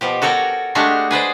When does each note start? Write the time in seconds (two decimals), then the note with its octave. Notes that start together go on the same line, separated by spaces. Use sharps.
0.01 B2 F3 G4
0.22 F#4 A4 A#4 C#5 G5
0.75 G#3 A3 D4 F#4 G4 F5
1.11 G#4 B4 C5 D5